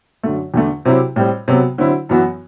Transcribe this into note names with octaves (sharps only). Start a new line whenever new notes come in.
F#2 D3 A3
E2 D3 A3
C3 F#3 C4 E4 G4
A2 G3 C4
C3 F#3 B3
D3 F#3 C4 E4
F#2 E3 B3 F#4